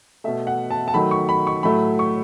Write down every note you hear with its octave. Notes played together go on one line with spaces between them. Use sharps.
B2 A3 E5
F#5
A5
A5
D#3 F#3 A3 B5
C#6
B5
C#6
A2 F#3 A3 B5
C#6